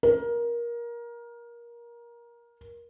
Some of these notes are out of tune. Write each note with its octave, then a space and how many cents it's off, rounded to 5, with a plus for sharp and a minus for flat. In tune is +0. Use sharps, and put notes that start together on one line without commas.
A#4 +20